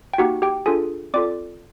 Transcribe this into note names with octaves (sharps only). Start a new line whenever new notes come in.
G5
A#3 D#4 F#4 G4 F#5
G4 G5
D4 F4 G#4 A4 G#5
C4 F4 A4 D5 D6